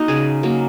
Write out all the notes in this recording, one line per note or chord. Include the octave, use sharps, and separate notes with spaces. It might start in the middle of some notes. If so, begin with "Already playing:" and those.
Already playing: A#3 D#4 F#4
C#3 G#4
F#3 A#3